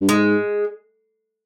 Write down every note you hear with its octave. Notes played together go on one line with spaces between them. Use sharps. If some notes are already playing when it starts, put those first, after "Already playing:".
G2
G#2 G#3